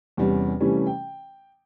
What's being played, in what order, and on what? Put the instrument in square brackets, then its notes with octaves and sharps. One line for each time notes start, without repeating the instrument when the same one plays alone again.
[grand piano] E2 C3 G3 C#4
C3 E3 G3 A3 C#4
G5